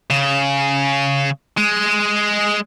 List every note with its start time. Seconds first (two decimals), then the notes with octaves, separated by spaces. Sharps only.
0.10 C#3
1.57 G#3